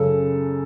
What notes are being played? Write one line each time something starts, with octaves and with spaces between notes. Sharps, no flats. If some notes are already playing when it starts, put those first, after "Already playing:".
Already playing: F#2 C#3 A4